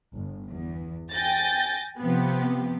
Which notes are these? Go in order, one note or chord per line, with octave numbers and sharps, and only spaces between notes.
G1
E2
G5 G#5 G6 A6 A#6
C3 F3 B3 G4